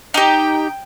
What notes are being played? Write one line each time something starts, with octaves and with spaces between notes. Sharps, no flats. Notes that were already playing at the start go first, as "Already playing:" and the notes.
D#4 G4 G5